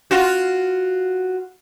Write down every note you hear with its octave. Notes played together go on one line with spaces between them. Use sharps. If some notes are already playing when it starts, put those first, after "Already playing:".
F4 F#4